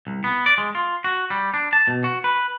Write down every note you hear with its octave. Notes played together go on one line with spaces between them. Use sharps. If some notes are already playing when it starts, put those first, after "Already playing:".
C2
B3
D5
G#3
F4
F#4
G3
D4
A5
B2
F#4
B4